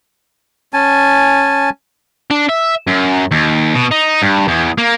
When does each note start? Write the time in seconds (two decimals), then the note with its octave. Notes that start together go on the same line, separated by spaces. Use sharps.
0.73 C#4 G#5 A5
2.31 D4
2.49 E5
2.87 F#2
3.31 D#2
3.75 B2
3.91 D#4
4.22 G2
4.48 E2
4.78 A#3